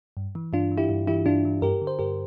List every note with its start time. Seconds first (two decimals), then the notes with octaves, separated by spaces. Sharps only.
0.17 G2
0.35 E3
0.53 G2 D4 F4
0.72 E3
0.78 E4 G4
0.89 G2
1.07 E3 E4 G4
1.26 G2 D4 F4
1.45 E3
1.62 G2 G4 A#4
1.82 D3
1.87 C5
1.99 G2 G4 A#4